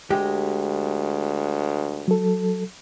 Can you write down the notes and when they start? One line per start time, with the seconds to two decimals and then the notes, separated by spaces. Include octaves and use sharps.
0.10 D2 G#3 G4
2.08 F#3 A4